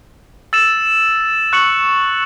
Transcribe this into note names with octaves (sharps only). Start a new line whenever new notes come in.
E6 A6 E7
C#6 F#6 C#7 F#7